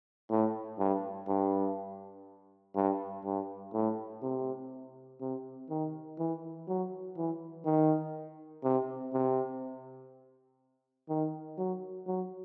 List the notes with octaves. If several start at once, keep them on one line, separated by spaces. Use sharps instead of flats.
A2
G2
G2
G2
G2
A2
C3
C3
D#3
E3
F#3
E3
D#3
C3
C3
D#3
F#3
F#3